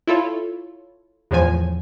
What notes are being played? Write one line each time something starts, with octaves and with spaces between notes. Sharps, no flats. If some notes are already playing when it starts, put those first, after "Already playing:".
E4 F4 A4 C#5
E2 A2 F3 G#5